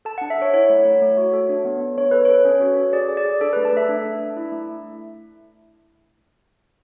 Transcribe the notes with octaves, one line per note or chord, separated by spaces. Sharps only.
A4 A5
D4 F#5
E5
A4 C#5
E4 C#5
A3
A3
A3
F#4
A4
D4
B3
B3
D4 C#5
A4 B4
A4 C#5
C#4
F#4
A4
G#4 D5
G#4
D5
G#4
D4 A4
A3 B4
A5
A3 E5
D4
D4
D4
E4
A3